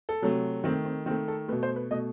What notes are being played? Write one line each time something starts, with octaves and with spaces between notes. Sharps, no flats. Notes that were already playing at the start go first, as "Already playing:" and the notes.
A4
C3 F#3 A3
D#3 A3 C4
C4
D#3 A3 C4
A4
B2 A3 B4
C5
B4
B2 A3 D#5